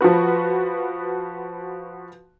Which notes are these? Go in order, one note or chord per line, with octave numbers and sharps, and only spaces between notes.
F3 F4 F#4 B4